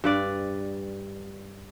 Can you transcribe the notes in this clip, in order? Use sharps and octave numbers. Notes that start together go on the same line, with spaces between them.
G2 B4 D5